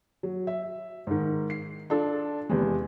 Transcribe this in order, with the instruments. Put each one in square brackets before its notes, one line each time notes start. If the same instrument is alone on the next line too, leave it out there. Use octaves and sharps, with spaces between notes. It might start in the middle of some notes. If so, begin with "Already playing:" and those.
[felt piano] F#3
E5
G#2 D#3
C7
D4 F4 A4
E2 C3 G#3